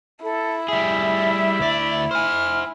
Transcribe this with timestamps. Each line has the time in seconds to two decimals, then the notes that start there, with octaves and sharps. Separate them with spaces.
0.23 E4 A4
0.68 G3 G#4 E5
1.59 D2 D5
2.11 C5 G#5 F6